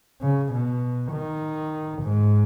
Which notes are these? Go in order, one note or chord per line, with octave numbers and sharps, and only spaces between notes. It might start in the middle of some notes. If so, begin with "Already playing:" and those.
C#3
B2
D#3
G#2